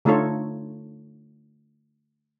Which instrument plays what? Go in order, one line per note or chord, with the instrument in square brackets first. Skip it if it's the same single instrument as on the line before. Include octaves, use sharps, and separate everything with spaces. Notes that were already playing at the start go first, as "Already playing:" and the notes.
[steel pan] D3 A3 D#4 F4 A4 C#5